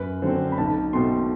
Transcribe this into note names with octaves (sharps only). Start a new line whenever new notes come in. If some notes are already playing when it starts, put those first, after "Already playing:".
Already playing: F#2 B4
D3 F#3 C4 C5
B5
B1 A5
B2 A3 C4 C6